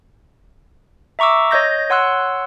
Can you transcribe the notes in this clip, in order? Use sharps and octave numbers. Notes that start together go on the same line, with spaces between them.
E5 A#5 C#6 D6 E6
C#5 D#5 G6 A#6
C#5 F#5 C6 E6 F#6